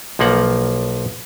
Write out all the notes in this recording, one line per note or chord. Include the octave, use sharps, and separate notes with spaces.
B1 F3 A#3 F#5